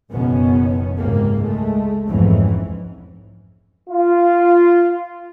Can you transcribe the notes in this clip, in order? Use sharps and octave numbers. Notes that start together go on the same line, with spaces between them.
F#1 F#2 B2 D#3 B3 C#4
C#2 G#2 C3 A#3
G#3 A3
B1 F2 G#2 E3 C#4
F4